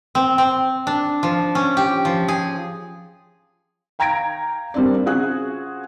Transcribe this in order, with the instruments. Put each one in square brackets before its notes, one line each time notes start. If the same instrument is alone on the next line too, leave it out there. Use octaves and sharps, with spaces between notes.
[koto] C4
C4
D4
F3
C#4
G4
F3
G#4
[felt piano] F5 G5 A#5 G#6 A#6 D7
G3 A#3 C4 D4 D5
C#3 C4 F4 F#4 G#4 F#6